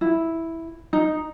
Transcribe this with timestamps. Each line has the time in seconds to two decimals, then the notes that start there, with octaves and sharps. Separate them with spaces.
0.01 E4
0.93 D#4